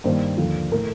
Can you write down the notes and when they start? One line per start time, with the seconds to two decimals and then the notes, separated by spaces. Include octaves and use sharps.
0.04 G2 D#3 A#3 C5
0.37 D#2 D3 F3 A#3
0.71 A2 A3 A#4